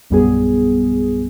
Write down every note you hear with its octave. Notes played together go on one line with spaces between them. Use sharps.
A#1 F#2 G3 B3 G#4